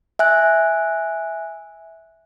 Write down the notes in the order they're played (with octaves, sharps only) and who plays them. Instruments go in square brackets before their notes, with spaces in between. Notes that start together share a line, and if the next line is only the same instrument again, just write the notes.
[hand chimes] E5 G#5 F#6